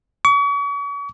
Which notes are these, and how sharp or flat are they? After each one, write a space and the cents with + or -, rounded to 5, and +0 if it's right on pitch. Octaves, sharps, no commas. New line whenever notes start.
C#6 +40